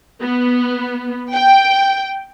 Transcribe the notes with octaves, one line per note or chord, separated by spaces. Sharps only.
B3
G5